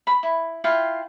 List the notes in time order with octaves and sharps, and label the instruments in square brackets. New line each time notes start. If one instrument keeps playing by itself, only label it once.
[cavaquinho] B5
E4
E4 F4 F5 G5